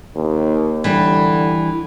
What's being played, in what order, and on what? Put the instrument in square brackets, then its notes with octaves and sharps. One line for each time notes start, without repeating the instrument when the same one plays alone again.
[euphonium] D#2
[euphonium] D3 [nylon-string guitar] E3 G3